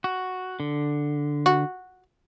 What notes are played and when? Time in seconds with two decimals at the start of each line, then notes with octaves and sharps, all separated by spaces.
0.04 F#4
0.60 D3
1.46 F#4